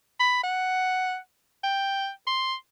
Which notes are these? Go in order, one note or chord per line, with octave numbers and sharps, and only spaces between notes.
B5
F#5
G5
C6